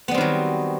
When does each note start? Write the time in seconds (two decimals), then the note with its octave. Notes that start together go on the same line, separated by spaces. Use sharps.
0.08 B3
0.11 G3
0.14 C4
0.18 D#3
0.21 F#3